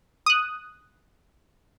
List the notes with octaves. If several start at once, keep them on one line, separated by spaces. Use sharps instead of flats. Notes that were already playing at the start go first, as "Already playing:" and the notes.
D#6 F#6